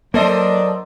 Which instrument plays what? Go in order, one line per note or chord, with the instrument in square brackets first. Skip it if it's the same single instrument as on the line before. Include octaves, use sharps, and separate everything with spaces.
[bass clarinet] F#3 [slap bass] A#3 [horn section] D4 A#4 D5 [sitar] A4 C5 D#5